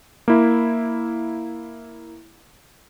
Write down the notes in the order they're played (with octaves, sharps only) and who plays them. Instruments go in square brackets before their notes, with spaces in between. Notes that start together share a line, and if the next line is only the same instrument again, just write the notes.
[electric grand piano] A#3 E4